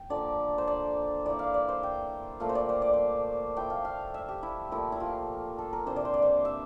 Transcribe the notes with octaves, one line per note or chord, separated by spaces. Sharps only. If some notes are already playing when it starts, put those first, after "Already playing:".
Already playing: G5
D3 F3 A#3 D5
C5
D5
E3 A#3 E4 D5
F5
D5
C5
G5
A#2 F3 A3 F5
C5
D5
C5
D5
C5
F3 A3 E4 G5
F5
F5
E5
G4
E4
A#2 F3 A3 E4
E4
F4
A4
A#4
C3 E3 A#3 D4 C5
D5
C5
D5
C5
E5